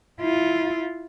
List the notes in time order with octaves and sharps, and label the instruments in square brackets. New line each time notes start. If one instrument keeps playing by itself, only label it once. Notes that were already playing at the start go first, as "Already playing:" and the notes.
[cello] E4 F4